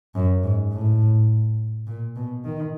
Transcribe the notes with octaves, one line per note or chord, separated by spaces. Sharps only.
F#2
G#2
A2
A#2
B2
D#3